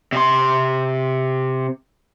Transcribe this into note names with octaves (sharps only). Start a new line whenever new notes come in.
C3 C6